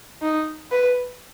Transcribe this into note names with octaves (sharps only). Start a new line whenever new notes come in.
D#4
B4